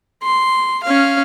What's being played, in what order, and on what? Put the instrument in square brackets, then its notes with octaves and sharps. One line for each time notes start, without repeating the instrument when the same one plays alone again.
[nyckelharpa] C6
C#4 F5